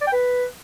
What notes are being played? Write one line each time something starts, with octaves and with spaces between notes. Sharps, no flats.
D5
G5
B4